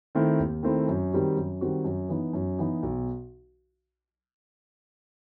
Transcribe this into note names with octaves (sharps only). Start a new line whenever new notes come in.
D#3 A3 C4 E4
D#2
D#3 A3 C4 E4
F#2
D#3 G3 C4 F#4
F#2
D#3 G3 C4 F#4
F#2
E3 B3 D#4
F#2
E3 B3 D#4
B1